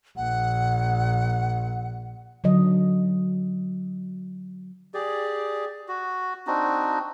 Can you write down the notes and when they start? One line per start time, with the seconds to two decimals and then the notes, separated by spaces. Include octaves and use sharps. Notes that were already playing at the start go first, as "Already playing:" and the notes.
0.17 A#1 F#5
2.44 D3 F#3 D#5
4.94 G4 G#4 D5
5.88 F#4
6.47 C4 D4 D#4 F#4